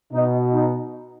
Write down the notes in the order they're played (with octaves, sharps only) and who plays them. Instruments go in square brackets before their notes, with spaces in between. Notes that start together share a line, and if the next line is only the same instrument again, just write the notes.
[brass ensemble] B2 D#4
D#4